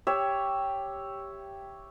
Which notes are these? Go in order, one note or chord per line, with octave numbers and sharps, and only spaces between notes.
G4 C#5 E5